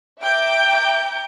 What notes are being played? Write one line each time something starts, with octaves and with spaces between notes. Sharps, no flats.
E5 G5 A#5 D6 G6 D7